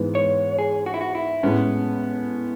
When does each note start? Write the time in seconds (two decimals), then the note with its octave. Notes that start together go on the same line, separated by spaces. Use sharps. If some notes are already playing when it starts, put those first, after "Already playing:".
Already playing: G#2 E3 G#3 B3
0.15 C#5
0.59 G#4
0.86 F#4
0.94 E4
1.01 F#4
1.15 E4
1.43 A2 G#3 B3 C#4